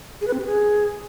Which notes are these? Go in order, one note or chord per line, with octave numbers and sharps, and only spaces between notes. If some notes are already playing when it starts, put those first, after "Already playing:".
G#4
B4
C4
G4
G#4